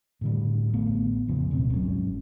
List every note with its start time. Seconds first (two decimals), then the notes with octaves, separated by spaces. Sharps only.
0.21 A2 D3 G3
0.73 A1 A3 B3
1.28 F#1 E2 C#3 F3
1.51 D1 B2 B3 C4
1.73 G1 G#2 F#3 C#4